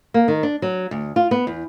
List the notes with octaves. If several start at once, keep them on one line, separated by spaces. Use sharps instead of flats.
A#3
D#3
D4
F#3
D2
F4
B3
E2